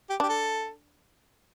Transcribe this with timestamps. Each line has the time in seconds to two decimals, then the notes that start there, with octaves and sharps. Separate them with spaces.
0.10 G4
0.20 D4 G4
0.29 A4